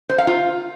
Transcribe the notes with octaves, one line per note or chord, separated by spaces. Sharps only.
C5
F5
F4